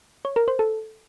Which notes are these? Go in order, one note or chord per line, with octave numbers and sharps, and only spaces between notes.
C#5
A#4
C5
A4